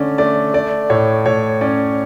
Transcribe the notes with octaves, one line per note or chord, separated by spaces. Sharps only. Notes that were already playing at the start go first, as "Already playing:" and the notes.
Already playing: D3 A3 C#4 D5
A3 D5
A3 D5
A2 C#5
A2 C#5
C#4 D5